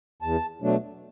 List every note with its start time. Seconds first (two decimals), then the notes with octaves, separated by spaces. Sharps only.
0.22 E2 A5
0.62 B2 F#3 A3 D4